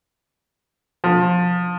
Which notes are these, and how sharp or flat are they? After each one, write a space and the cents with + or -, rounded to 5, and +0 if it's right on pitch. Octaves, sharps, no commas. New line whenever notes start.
F3 +25